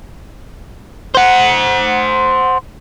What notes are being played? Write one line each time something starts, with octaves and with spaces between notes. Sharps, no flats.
C5 F#5